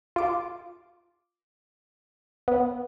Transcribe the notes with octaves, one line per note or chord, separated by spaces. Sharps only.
F4 D6
B3